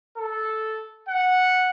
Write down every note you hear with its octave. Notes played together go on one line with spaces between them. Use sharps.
A4
F#5